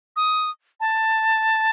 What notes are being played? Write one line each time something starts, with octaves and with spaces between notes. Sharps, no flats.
D#6
A5